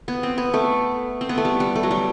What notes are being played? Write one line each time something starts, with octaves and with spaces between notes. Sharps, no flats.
B3
C4
B3
A3
C4
B3
A3
G3
G3
A3
F#3
G3